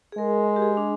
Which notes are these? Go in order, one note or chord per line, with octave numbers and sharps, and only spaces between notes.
G#4
G#3 A#4
G4
G#4
D4